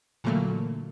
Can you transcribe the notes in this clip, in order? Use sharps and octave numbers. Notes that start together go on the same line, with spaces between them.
A#2 D3 E3 F#3 A3 A#3